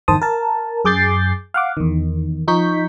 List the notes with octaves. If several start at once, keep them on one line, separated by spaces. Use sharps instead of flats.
G1 E2 D#3 C5 A5 D#6
A#4 A5
F#2 G#4 D6 G6 A6 C7
F5 F#5 D6
E2 D#3
F3 D#4 C#6 G6 B6